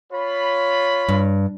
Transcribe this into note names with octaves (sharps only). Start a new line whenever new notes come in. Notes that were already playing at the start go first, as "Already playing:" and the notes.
F4 C#5 B5
G2